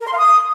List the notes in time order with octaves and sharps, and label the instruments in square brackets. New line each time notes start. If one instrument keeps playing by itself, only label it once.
[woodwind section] A#4
C6
F5
D#6